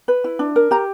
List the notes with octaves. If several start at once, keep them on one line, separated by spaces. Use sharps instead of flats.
B4
E4
D4
A#4
G4 A#5